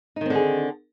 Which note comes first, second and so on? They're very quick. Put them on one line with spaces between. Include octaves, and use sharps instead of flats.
D#4 D#3 C4 D3 G#4